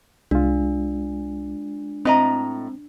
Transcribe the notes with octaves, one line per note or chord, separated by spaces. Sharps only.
C2 G#3 D4 F4
A2 C4 D#5 A#5